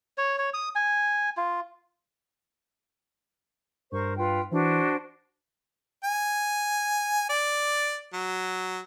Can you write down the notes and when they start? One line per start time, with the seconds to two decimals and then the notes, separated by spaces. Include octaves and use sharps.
0.18 C#5
0.38 C#5
0.54 D#6
0.75 G#5
1.37 F4
3.92 G2 A#4 C5 C#6
4.17 F4 B4 G5
4.51 E3 D4 F#4 C5
6.04 G#5
7.29 D5
8.14 F#3